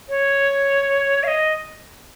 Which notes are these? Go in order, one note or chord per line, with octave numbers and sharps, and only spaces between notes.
C#5
F5
D#5